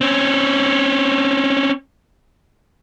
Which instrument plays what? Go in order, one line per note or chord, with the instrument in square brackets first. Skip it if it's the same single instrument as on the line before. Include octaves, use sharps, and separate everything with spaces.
[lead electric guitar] C4 C#4